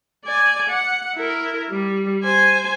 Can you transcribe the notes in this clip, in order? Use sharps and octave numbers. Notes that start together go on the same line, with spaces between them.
D5 G#5
F#5
E4 A#4
G3
C5 G#5